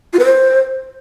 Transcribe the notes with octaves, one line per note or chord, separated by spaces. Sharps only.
F4
B4
C5